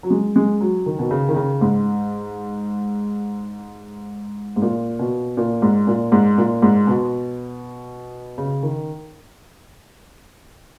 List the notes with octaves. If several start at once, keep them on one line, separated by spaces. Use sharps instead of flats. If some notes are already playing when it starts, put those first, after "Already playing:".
F#3
G#3
G#3
F#3
D#3
B2
C#3
D#3
C#3
G#2
G#2
A#2
B2
A#2
G#2
A#2
G#2
A#2
G#2
B2
C#3
D#3